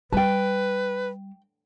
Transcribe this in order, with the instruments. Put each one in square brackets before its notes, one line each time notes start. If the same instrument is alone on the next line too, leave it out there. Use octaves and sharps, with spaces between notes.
[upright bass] G3 [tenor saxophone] B4 [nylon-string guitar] G5 A5